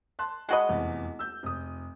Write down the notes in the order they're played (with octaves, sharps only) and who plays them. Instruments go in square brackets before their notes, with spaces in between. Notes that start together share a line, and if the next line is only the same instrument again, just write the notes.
[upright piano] A5 C6 F#6
[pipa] G#3 F#4 D#5 [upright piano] A5 B5
[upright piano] F1 E2
E6 G6
F1 D#6